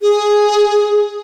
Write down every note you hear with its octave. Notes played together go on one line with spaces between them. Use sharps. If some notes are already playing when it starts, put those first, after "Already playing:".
G#4